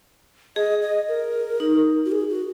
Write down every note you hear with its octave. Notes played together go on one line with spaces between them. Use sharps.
G#4 D#5
D#5
A#4
D#4
F#4
G#4
F#4